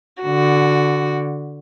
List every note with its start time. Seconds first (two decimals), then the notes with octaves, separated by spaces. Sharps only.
0.22 D3 F#4